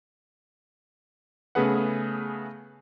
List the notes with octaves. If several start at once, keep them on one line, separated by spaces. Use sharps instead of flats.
C#3 A3 B3 G#4 B4 F#5